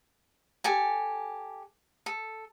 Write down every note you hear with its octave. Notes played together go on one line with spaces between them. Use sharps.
G4 A4 G#5
A4